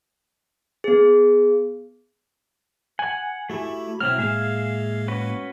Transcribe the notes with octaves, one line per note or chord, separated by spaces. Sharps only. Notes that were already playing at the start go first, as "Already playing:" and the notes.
B3 G#4
F#5 G#5
A3 E4 F#4 G4 B5
B2 F#3 A3 C4 E4 F6
A2 G#3 A#3 G#4 E5 F5
C#4 F#4 B4